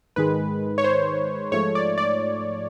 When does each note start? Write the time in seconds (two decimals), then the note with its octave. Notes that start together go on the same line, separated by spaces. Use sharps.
0.16 G#2 D#3 G#3 B4
0.78 C#5
0.84 C5
1.52 G#2 F3 A3 C#5
1.75 D5
1.98 D5